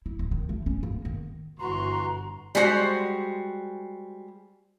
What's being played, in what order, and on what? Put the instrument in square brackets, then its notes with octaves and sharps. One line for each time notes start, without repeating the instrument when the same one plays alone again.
[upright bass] E4
D1
D#3
A3
C#4
A#3
D#3
[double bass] G1 [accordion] E3 F#4 [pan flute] A#5 [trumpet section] C6
[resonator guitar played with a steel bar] G3 G#3 F#4 C5